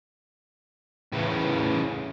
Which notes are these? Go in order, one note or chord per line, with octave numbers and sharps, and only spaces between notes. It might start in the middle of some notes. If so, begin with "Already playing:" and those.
A2 C#3 E3